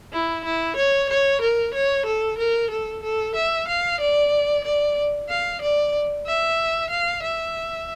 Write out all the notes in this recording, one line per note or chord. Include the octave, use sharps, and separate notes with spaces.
E4
E4
C#5
C#5
A#4
C#5
A4
A#4
A4
A4
E5
F5
D5
D5
F5
D5
E5
F5
E5